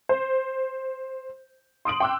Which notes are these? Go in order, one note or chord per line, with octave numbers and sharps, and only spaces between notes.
C5
C6 D#6 D7 F#7
G5 C6 D6 E6 F#6